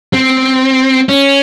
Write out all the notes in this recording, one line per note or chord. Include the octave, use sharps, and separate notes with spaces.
C4
C#4